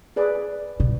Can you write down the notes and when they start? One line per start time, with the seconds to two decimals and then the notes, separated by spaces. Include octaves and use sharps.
0.16 G#4 B4 D5
0.80 B2